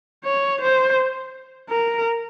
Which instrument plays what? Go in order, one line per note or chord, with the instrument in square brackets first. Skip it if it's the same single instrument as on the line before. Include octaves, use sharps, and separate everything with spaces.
[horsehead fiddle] C#5
C5
A#4